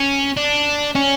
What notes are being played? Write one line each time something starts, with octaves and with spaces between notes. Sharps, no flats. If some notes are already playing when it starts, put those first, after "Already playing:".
Already playing: C#4
D4
C#4